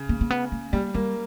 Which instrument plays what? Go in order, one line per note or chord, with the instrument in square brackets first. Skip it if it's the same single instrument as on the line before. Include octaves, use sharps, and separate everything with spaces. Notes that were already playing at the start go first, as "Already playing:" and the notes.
Already playing: [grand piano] C#3
[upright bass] A#3
A#3
B3
A#3
[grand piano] G3 [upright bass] A#3
[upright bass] G3 [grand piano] A#3